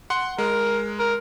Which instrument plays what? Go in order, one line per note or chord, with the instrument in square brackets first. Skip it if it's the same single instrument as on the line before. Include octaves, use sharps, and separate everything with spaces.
[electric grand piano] F#5 C6
[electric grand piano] G#3 [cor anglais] A#4
[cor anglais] A#4